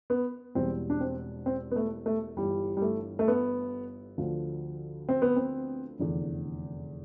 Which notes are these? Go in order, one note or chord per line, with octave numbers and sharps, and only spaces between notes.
B3
E1 E2 B2 G3 C4
D4
C4
C4
B3
A3
A3
G1 G2 E3 G3
G3
A3
A3
B3
D2 D3 F3
C4
B3
C4
F1 E2 D3